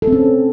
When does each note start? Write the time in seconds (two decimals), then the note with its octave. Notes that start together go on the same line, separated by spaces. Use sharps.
0.02 A4
0.07 C4
0.13 C#4